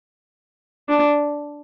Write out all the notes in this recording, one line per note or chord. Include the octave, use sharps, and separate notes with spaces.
D4